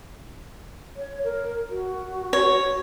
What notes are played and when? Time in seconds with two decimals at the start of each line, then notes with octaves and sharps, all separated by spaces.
0.96 C#5
1.24 A#4
1.70 F#4
2.33 C#5